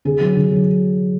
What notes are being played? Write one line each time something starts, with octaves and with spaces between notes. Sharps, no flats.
D3 G#4
F#3
D3
F#3